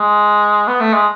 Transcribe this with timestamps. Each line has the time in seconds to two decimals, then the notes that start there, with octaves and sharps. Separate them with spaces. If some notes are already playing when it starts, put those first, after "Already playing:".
Already playing: G#3
0.68 B3
0.81 A3
0.94 G#3